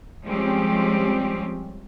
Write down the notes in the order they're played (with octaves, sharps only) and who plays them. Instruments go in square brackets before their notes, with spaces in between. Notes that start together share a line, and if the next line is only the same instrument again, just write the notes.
[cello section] F3 G3 G#3 C4 C#4 G4